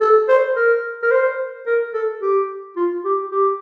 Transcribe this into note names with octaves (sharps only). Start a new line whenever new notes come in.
A4
C5
A#4
A#4
C5
A#4
A4
G4
F4
G4
G4